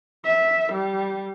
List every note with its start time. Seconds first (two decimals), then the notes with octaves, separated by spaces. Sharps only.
0.24 E5
0.72 G3